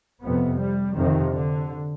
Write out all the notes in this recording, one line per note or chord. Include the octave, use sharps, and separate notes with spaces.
F2 C3 B3
G3
F2 C3 D#3
D3